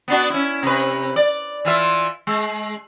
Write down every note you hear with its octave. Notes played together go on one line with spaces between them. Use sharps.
B3 D4 F#4
C#4 E4
C3 B4
D5
E3 F4 E5
G#3